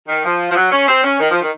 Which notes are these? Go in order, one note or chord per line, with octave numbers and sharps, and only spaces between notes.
D#3
F3
F3
F#3
C#4
C4
C#4
D#3
F3
D#3